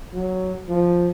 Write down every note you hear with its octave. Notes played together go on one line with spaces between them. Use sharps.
F#3
F3